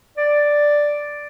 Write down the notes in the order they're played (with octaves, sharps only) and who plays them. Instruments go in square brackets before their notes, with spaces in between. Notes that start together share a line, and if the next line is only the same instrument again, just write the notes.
[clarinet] D5